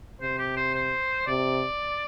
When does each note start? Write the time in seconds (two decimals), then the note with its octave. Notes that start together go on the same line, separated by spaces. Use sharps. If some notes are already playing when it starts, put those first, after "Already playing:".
0.21 C3 C5
0.39 G4
0.57 C5
0.74 C5
1.27 C3 D5